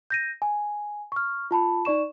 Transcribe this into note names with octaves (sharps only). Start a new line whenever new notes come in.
G6 A#6 D#7
G#5
C#6 F6
F4 A5 B5
D#4 D5 C#6 E7